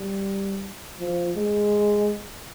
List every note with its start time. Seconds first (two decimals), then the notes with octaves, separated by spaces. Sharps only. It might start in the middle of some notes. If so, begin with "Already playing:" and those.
Already playing: G3
1.00 F3
1.36 G#3